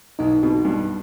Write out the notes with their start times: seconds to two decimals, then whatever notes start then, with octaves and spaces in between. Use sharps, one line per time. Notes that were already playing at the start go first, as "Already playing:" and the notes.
0.19 B1 D#4
0.43 B2
0.65 G2